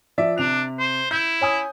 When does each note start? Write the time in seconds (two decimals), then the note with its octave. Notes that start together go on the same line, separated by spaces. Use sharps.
0.18 F3 D5 E5
0.38 C3 D4 F7
0.79 C5
1.11 E4 G6
1.41 C#5 G#5 D#6